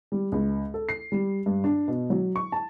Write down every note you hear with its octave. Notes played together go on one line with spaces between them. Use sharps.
G3
C#2
A4
C7
G3
G2
D4
B2
F#3
C#6
A5